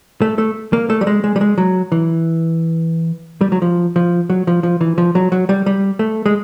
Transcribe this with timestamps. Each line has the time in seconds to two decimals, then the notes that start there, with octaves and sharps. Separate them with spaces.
0.22 A3
0.38 A3
0.73 A#3
0.90 A3
1.01 G3
1.07 G#3
1.24 G#3
1.36 G3
1.41 G#3
1.58 F#3
1.92 E3
3.41 G3
3.52 F#3
3.62 F3
3.96 F3
4.30 F#3
4.47 F3
4.63 F3
4.81 E3
4.98 F3
5.15 F#3
5.32 F#3
5.49 G3
5.66 G3
5.99 A3
6.26 G#3